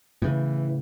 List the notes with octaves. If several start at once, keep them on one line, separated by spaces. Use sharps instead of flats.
A2 C#3 E3